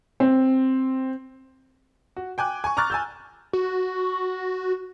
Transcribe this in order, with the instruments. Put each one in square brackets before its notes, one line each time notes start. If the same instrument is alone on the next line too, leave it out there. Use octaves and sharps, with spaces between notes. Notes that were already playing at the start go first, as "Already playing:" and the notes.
[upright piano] C4
F#4
G5 G#5 D6 F#6
G#5 C#6
A#5 C#6 D6 F6 F#6 A6
G#5 E6 G6
[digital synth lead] F#4